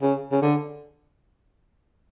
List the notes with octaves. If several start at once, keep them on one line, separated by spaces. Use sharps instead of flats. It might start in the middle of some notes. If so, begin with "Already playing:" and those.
C#3
C#3
D3